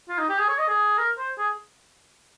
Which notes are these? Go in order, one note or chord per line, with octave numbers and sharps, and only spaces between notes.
F4
D#4
G4
G#4
C#5
D#5
G#4
A#4
C5
G#4